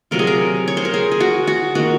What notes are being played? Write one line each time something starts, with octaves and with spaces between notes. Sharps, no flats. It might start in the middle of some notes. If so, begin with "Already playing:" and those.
C3 F#3 C4 F4 A#4
G#4
A#4
C#5
C5
A#4
G#4
G#4
F#4
F#4
D#3 A#3 F4 F#4